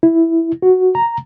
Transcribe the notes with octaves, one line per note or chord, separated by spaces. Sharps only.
E4
F#4
A#5